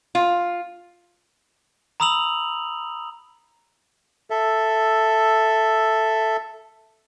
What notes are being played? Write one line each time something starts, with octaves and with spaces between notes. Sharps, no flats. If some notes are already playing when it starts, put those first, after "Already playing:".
F4
A#5 B5 D#6 E6 F7 F#7
A4 E5